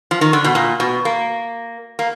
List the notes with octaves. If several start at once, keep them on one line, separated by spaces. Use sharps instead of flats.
F3
D#3
D3
B2
A#2
B2
A#3
A#3